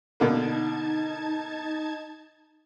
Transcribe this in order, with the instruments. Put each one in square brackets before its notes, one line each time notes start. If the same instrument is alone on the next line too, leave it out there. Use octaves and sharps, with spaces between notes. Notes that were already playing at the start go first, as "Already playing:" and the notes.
[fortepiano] B2 D3 A#3 [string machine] D#4 A5 G#6